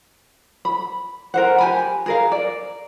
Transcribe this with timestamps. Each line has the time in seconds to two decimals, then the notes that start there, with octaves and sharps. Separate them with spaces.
0.65 B5
1.34 A#4 C5 F#5
1.58 G4 G#5 B5
2.06 G#4 A#4 F5
2.32 D5